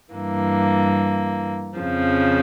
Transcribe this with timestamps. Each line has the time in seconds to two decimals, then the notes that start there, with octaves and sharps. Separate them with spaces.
0.13 G2 E3 A#3
1.78 F2 C#3 F3